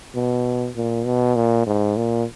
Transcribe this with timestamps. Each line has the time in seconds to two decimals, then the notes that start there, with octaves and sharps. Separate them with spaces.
0.15 B2
0.76 A#2
1.05 B2
1.36 A#2
1.67 G#2
1.97 A#2